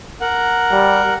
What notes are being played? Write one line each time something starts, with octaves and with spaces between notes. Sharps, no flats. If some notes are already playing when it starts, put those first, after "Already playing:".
A#4 F#5
G3